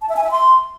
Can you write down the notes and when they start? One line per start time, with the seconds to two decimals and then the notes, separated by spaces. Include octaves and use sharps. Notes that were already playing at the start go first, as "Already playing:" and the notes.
0.02 A5
0.09 E5
0.16 G#5
0.24 E5
0.31 C6